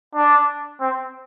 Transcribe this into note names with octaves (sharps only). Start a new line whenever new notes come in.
D4
C4